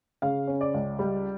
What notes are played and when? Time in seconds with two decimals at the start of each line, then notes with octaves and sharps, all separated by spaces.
0.22 C#3 F5
0.47 C#4
0.61 D5
0.74 C#2
0.99 G3